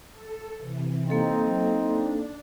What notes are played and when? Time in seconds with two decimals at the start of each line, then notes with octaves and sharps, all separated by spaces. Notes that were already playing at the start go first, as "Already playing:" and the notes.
0.11 A4
0.57 C3 E3
1.09 A#3 C4 D#4 A4 F5
1.43 F#3
1.79 D4